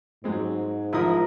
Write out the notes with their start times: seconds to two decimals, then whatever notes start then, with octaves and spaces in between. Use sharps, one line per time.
0.24 G#2 F#3 G#3 C4
0.93 A1 F3 E4 F4 A#4 D#6